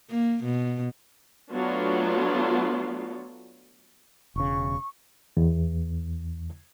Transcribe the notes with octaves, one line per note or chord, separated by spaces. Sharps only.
A#3
B2
F#3 A3 B3 D4 F4
E1 C#3 C#6
E2